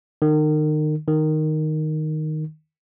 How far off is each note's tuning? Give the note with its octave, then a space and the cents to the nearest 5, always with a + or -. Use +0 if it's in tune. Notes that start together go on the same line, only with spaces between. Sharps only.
D#3 -30
D#3 -5